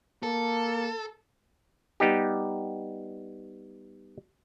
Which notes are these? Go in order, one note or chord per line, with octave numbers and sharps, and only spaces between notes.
A#3 A4
G3 B3 D#4 G4